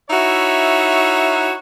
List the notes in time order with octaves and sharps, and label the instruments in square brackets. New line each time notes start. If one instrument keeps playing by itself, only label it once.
[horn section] D#4 E4 F#4 C#5 E5